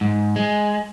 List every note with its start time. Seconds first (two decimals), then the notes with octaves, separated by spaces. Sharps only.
0.01 G#2
0.36 G#3